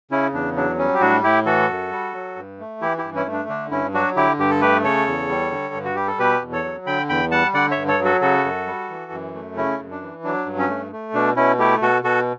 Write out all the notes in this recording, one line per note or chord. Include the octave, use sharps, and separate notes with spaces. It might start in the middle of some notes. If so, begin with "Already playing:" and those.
C#3 C#4 E4
E2 D4
F#3 D4
G3 C#4
G4
A2 D4 F#4
A2 E4 G4
E3 F#4 A4
F#2
G3
F#3
G2
A3
E3 E4 G4
E4 G4
G2
C#4 E4
A3
D4
D3 D4
G2 C#4 E4
F#3 D4 F#4
D3 E4 G4
G2 G4
A4
A3 G4 B4
C#3 A4 C#5
E2
G3
D3
G2
F#4
G3 G4
A4
B2 G4 B4
E2
A4 C#5
F#3
D3 G5 B5
E2 G5 B5
G3 F#5 A5
D3 D5 F#5
C#5 E5
G2
A4 C#5
F#3
F#4 A4
C#3 F#4 A4
F#2
G3
E3
F#2
A3
C#3 C#4 E4
F#2
D4
E3
F#3 D4
G2
C#4
A3
A3
B2 D4
B2 C#4 E4
A3 E4 G4
B2 F#4 A4
B2 F#4 A4